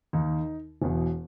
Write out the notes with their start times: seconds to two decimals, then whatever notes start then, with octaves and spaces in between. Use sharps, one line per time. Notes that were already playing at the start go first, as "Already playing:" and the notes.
0.13 D#2 D#3 D#4
0.82 E1 E2 B2